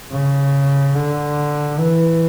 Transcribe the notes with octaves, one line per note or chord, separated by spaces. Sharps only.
C#3
D3
E3